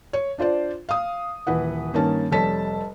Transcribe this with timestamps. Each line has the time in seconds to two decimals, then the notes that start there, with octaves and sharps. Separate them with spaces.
0.13 C#5
0.38 D4 F4 C5 D5
0.89 F5 D#6
1.47 D#1 E3 B4 F#5
1.94 G2 D#3 A#3 C#4 A5
2.31 F1 G3 A4 C#5 A5 B6